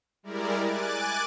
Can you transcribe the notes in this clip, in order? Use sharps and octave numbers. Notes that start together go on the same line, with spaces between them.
G3 G#3 E4 A#4 D5
G#5 D6 F#6 A6